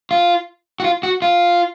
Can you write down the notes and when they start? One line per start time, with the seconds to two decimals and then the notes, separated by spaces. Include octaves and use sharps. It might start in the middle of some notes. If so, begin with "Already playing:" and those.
0.11 F4
0.80 F#4
0.84 F4
1.03 F#4
1.22 F4